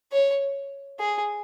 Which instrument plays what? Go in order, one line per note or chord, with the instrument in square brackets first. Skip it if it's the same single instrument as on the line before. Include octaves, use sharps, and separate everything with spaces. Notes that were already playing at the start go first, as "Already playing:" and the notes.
[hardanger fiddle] C#5
G#4